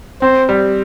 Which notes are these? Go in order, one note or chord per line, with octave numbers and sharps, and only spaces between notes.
C4 C5
G3